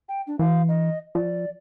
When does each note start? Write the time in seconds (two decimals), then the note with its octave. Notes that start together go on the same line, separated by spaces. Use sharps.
0.09 G5
0.27 D4
0.39 E3 F5
0.68 D#5
1.15 F3 D5